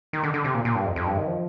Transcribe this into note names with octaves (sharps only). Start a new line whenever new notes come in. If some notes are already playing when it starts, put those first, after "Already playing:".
D#3
D3
D3
C3
A#2
A#2
G2
F2
F2
G2
D#3
F3